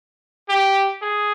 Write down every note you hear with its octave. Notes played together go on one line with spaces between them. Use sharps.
G4
G#4